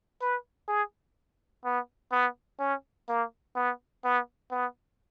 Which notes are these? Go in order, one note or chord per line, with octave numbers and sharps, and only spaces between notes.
B4
G#4
B3
B3
C#4
A#3
B3
B3
B3